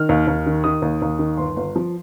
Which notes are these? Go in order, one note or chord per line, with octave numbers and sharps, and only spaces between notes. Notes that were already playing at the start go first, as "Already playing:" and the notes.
Already playing: D#3 F6
D#2
D#2
D#3
D#3 D#6
D#2
D#2
D#3
G1 C6
G1
F3